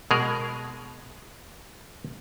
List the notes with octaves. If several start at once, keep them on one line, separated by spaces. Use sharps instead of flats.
B2 G#3 G#4 A#4